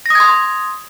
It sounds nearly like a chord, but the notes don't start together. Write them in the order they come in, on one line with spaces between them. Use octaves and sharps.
A#6 D#6 G#6 C6